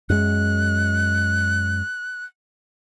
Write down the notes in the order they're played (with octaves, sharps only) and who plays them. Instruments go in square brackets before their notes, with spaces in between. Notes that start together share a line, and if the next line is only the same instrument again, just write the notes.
[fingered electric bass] F#2 G#3 [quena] F#6